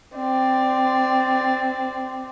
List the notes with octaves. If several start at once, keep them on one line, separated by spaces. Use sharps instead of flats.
C4 D5